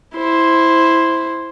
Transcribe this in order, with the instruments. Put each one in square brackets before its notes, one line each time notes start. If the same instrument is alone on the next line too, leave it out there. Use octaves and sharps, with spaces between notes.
[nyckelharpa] E4 C5